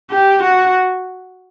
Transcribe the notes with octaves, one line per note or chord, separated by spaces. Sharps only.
G4
F#4